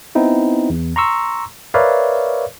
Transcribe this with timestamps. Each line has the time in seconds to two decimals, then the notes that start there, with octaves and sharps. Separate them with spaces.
0.15 B3 C4 D#4 E4
0.70 E2
0.96 A#5 C6 C#6 E6
1.74 A#4 B4 C#5 D5 E5 F5